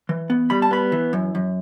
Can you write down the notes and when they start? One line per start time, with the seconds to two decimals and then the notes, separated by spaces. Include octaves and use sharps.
0.09 E3
0.30 B3
0.50 G3 B5
0.62 A5
0.71 B3 B5
0.92 E3
1.13 F#2
1.35 F#2